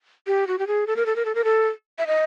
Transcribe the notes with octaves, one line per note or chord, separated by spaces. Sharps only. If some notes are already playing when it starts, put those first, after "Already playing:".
G4
F#4
G4
G#4
A4
A#4
A4
A#4
A4
A#4
A4
E5
D#5